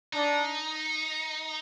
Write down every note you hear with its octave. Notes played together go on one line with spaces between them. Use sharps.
D4 D#4